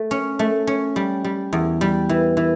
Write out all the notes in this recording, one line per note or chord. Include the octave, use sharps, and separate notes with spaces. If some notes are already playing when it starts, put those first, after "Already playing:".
Already playing: A3
C#4
A3
C#4
G3
G3
E2
G3
E3
E3